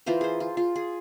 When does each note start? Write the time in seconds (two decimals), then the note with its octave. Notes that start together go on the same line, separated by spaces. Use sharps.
0.06 E3 F4 A#4 C5
0.21 G#4 C5
0.40 F4
0.57 F4
0.76 G#4